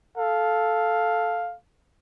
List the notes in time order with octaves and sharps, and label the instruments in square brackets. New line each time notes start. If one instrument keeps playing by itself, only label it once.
[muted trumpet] A4 [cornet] F5